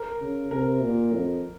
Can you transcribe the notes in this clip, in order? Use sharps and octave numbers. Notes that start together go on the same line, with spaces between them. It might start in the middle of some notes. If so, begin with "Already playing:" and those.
Already playing: A#4
C#3
C3 A#4
A#2
F2